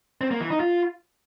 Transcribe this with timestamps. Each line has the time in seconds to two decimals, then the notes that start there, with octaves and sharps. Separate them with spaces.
0.21 C4
0.31 A#3
0.41 E3
0.50 D#4
0.60 F4